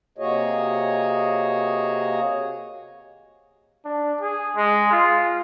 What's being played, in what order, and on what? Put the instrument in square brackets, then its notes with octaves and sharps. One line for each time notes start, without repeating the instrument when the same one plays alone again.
[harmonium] C3 A#3 F#4 G#4 C#5 D#5
[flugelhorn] D4
G#4
G#3
F4